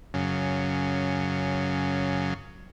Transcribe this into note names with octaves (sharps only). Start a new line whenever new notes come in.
F#2 C#3